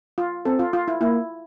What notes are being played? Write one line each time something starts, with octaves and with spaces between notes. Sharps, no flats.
F4
C4 A4
F4
F4
E4
A#3 E4